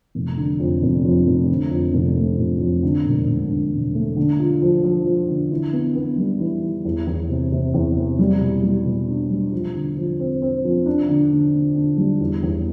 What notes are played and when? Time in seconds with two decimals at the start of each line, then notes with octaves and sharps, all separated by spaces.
0.15 F1
0.37 D3
0.60 F2
0.82 F1
1.05 F2
1.27 F1
1.49 D3
1.71 F2
1.93 F1
2.16 A3
2.38 F1
2.61 F2
2.83 D3
3.05 E1
3.27 E1
3.50 D3
3.73 E1
3.95 A3
4.16 D3
4.39 F4
4.62 F3
4.84 F3
5.06 F3
5.28 D3
5.51 E3
5.73 B3
5.95 B3
6.18 G3
6.40 E3
6.63 E3
6.85 E2
7.07 E2
7.29 C3
7.52 C3
7.74 E2
7.96 C3
8.19 G3
8.41 B2
8.63 G3
8.86 B2
9.08 D4
9.31 G3
9.53 F3
9.75 D3
9.97 F3
10.20 C4
10.42 C4
10.64 F3
10.86 D4
11.09 D3
11.32 D3
11.53 D3
11.75 D3
11.98 G3
12.21 E2
12.43 E2